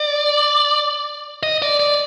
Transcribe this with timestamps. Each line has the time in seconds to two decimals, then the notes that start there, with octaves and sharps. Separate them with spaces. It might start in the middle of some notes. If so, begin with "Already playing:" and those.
Already playing: D5
1.43 D#5
1.62 D5
1.80 D5